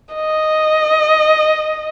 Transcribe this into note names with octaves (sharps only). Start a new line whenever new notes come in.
D#5